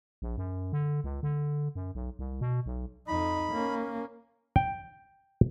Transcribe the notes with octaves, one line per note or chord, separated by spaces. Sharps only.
A#1
F#2
D3
C#2
D3
F#2
B1
C2
B2
B1
F2 D#4 B5
A#3 C#4
G5